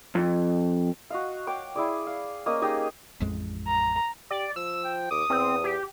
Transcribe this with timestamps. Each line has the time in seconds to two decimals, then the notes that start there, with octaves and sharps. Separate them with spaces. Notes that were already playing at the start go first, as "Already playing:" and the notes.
0.15 F2
1.10 F#4 D#5 F5
1.47 C#5 G5 D6
1.76 E4 G#4 D5
2.07 F5
2.46 A#3 C#4 D#5
2.62 D#4 G4 G#4
3.21 A1 F2 G#3
3.67 A#5
4.30 G4 D5
4.56 F3 E6
4.84 G5
5.11 D#2 D6 D#6
5.30 E2 C4
5.64 G4